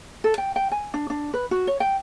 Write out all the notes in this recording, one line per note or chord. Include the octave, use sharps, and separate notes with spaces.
A4
G5
G5
G#5
D4
D4
B4
F#4
C#5
G5